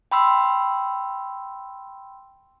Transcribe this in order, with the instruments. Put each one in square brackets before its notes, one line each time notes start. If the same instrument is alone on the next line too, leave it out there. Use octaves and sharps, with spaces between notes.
[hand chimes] G5 B5 C6 E6